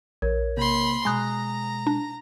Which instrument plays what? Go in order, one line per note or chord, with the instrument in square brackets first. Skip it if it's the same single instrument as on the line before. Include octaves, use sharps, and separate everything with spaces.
[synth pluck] A#1 [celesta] A#4 C#5 G#6
[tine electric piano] C3 A#3 [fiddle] B5 C6
[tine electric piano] B2 G#3 [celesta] G#5 D#6 [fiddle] A#5 [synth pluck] B5 F#6
[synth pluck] D4